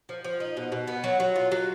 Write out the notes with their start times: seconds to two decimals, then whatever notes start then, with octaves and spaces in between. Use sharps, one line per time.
0.09 F3
0.24 F3
0.40 D#4
0.57 B2
0.72 B2
0.88 B3
1.04 F#3
1.20 F#3
1.36 F4
1.52 F#3